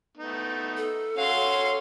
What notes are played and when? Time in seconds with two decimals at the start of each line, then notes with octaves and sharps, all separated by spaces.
0.17 A3 B3 D#4
0.77 A4
1.17 C#4 F#4 C#5 F5 C6